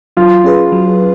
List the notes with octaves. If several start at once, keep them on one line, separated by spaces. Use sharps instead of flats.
F#3 F4
C#4 G#4 B4
F#3